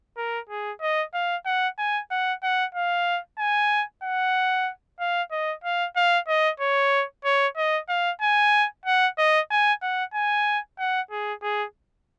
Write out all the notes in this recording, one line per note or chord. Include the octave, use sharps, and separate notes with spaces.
A#4
G#4
D#5
F5
F#5
G#5
F#5
F#5
F5
G#5
F#5
F5
D#5
F5
F5
D#5
C#5
C#5
D#5
F5
G#5
F#5
D#5
G#5
F#5
G#5
F#5
G#4
G#4